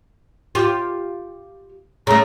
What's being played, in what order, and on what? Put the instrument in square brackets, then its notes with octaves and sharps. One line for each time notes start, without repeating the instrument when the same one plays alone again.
[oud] F4 G4
[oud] C#3 A3 [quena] A#5